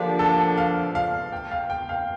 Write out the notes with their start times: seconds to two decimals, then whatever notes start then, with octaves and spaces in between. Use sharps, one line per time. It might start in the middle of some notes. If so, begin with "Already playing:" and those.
Already playing: D3 F3 A#3 D4 G4
0.19 A4
0.57 F5
0.95 F5
1.32 G5
1.51 F5
1.70 G5
1.89 F5